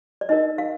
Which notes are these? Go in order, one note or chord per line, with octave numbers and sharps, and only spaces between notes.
D5
D#4 A#4 D#5
F5